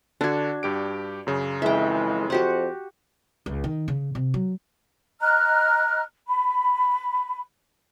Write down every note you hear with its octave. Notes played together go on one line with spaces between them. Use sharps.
D3 D4 F#4 G#6
G2 G4 D7
F#2 C#3
F2 E3 G#3 E5 G5
F2 F#4 G4 C5 F#5
C#2
D#3
C#3
C3
F#3
D#5 A#5 F6 F#6
B5